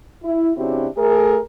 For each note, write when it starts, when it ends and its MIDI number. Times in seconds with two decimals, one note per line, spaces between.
0.24 0.51 64
0.56 0.87 49
0.56 0.87 60
0.56 0.87 62
0.56 0.87 64
0.56 0.87 66
0.56 0.87 67
0.97 1.39 57
0.97 1.39 68
0.97 1.39 70